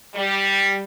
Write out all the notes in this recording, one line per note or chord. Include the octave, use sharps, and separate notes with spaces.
G3